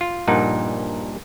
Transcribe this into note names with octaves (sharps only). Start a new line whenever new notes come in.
F4
A#1 G2 A#2 D#4 F#5